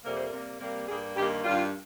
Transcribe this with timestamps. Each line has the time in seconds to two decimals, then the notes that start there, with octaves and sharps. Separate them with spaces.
0.03 F2 C3 G3 A#3 A#4
0.14 C5
0.25 A#4
0.31 C3 G3 A#3
0.59 C3 G3 A#3
0.87 G2 G3 A#3 G#4
1.16 G2 D#3 A#3 G4
1.43 G2 D#3 G3 F4